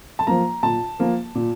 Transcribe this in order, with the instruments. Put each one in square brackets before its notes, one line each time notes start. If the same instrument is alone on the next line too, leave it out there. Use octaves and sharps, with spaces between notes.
[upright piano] A5
F3 A#3 A#5
A#2 A5
F3 A#3
A#2